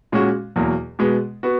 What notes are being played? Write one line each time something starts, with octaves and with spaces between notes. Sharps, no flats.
A#2 G#3 C#4 F#4
E2 B2 F#3 A#3
B2 G#3 B3
B3 F#4